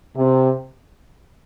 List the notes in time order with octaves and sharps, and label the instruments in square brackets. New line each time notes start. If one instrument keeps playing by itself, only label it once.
[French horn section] C3